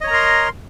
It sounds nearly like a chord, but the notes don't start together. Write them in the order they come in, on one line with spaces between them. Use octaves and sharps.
D#5 C#5 A#5 A#4 C6